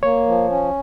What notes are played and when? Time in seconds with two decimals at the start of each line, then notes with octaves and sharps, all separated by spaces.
0.03 A#3 C#5
0.26 F3
0.50 C#4